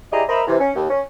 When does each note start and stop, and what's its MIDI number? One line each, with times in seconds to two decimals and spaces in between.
0.11 0.23 64
0.11 0.23 67
0.11 0.23 68
0.11 0.23 74
0.11 0.23 75
0.11 0.23 82
0.28 0.42 70
0.28 0.42 72
0.28 0.42 75
0.28 0.42 76
0.28 0.42 82
0.28 0.42 83
0.47 0.58 48
0.47 0.58 52
0.59 0.71 61
0.75 0.86 39
0.89 1.01 61